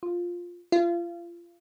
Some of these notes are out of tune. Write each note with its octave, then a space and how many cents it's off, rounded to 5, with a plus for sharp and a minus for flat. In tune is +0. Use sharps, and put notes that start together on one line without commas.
F4 +5
F4 -30